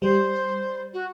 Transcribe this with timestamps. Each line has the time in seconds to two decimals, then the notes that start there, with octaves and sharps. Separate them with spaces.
0.02 G3 C5
0.93 F#4